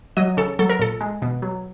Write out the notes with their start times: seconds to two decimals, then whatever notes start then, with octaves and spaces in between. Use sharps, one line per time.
0.17 F#3 D#5
0.37 C#3 A4
0.59 F#3 A4
0.69 A#4
0.79 A#2 A4
1.01 G#3
1.22 B2
1.42 F#3